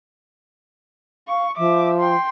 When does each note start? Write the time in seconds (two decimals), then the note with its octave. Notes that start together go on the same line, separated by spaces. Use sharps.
1.28 F5 C#6
1.57 F3 E5 D6
1.99 G5 C6